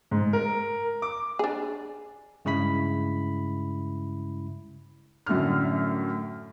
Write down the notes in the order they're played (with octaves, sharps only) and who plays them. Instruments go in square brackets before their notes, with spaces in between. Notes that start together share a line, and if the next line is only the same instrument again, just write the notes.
[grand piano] G#2
A#4
D6
[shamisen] D4 G#4
[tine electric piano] G2 C#3 G#3 E4 B5 B6
[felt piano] F#2 A2 D3 F6